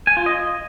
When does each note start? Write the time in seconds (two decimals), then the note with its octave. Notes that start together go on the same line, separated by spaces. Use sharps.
0.07 G#5
0.17 F4
0.26 D#5